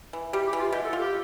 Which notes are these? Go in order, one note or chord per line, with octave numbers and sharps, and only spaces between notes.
E3
G3 G4
G4
E3
F4
B2 G4
A4
F4
G4